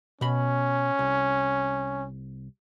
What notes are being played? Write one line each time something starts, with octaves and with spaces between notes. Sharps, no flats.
B2 C#4 B5
C2